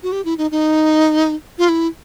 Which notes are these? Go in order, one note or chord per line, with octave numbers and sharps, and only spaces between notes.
F#4
G4
E4
D#4
D#4
F4
E4